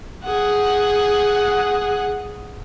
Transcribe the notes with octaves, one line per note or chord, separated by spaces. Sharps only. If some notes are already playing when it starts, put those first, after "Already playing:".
G#4 F#5